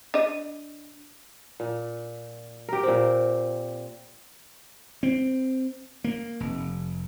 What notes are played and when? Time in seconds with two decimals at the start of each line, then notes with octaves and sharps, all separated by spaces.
0.14 D4 D#5
1.60 A#2
2.69 G4 A#4
2.83 A#2 C4
5.03 C4
6.04 A#3
6.40 F1